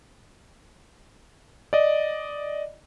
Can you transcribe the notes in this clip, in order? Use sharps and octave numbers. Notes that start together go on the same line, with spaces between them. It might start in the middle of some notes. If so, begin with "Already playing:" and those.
D5 D#5